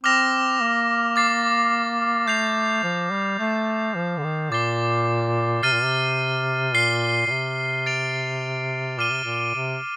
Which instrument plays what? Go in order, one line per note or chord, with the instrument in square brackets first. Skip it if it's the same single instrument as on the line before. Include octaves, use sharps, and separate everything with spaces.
[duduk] C4 [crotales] D6 F6 A#6 F7
[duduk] A#3
[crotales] D6 A6 C7
[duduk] A3 [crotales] G6 C7 F7
[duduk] F3
G3
[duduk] A3 [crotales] D6 G6 C7
[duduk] F3
D3
D#3
[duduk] A#2 [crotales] D6 A6 C7 G7
[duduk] C3 [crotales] F6 A6 C7 D#7
[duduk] A#2
C3
[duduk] A#2 [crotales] F6 C7 G7
[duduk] A#2
C3
[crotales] A6 D7 F7
[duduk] A#2 [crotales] D6 F6 C7 D#7 G7
[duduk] C3
A#2
C3